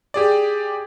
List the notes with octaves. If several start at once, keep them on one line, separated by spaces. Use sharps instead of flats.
G4 G#4 D5